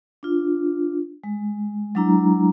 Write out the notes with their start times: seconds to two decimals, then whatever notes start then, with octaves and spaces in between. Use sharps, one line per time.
0.23 D4 F4
1.24 G#3
1.95 F#3 G#3 D4 E4 A#5